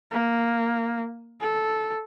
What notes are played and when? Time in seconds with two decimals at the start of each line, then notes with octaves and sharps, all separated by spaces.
0.11 A#3
1.41 A4